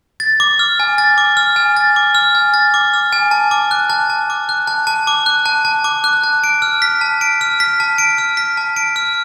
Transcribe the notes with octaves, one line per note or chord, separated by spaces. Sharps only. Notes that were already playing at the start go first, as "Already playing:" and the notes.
A6
D6
F6
G#5
A6
D6
F6
G#5
A6
D6
F6
G#5
A6
D6
F6
G#5
A5
D6
F#6
A5
A5
D6
F#6
A5
A5
D6
F#6
A5
A5
D6
F#6
A5
D7
F6
B6
A5
D7
F6
B6
A5
D7
F6
B6
A5
D7
F6